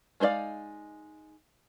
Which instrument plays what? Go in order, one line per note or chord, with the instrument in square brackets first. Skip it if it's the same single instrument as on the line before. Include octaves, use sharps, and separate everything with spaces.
[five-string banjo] G#3 D#4 C5 D5 F5